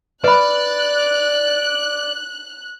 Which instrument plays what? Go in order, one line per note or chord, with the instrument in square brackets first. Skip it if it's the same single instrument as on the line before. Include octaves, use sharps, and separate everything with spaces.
[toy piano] B4 B5 [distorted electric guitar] D5 [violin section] F#6